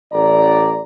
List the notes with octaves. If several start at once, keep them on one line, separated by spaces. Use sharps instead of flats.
A1 D5 A#5